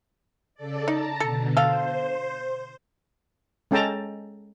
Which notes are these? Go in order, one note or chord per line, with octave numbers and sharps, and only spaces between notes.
C#3 A4 D5
D#4 A5 A#5
B2 D3 A4
A4 C5 F5
G#3 C#4 A4 G5 A5 A#5